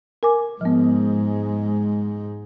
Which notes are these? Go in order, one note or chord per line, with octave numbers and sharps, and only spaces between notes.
A#4 G#5 D6
G#2 F3 G#3 B3